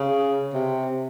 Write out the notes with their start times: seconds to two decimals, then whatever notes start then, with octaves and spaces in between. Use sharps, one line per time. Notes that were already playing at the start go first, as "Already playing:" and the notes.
Already playing: C#3
0.53 C3